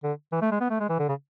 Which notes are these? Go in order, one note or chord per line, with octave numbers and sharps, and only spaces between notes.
D3
E3
A3
G#3
B3
A3
G#3
E3
D3
C#3